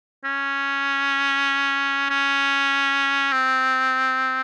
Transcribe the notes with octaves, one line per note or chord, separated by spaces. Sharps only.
C#4
C#4
C4